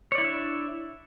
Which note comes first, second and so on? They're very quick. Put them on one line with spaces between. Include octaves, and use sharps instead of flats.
C#5 D5 E4 D4 E5